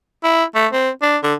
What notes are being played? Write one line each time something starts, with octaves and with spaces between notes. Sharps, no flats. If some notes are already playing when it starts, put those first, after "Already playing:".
E4
A3
C4
D4
D3